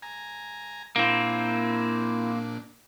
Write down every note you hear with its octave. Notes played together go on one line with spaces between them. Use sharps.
G#5 A#5
A#2 A#3 C4 D4 E4